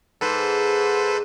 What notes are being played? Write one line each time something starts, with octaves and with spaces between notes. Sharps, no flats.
G#2 A4 B4 C5